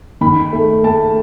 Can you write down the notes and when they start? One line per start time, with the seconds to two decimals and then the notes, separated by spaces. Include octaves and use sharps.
0.21 D#3 B5
0.53 A3
0.84 A3 A5